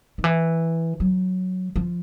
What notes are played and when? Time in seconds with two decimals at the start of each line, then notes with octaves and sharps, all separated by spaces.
0.18 D#3
0.24 E3
1.00 F#3
1.76 F3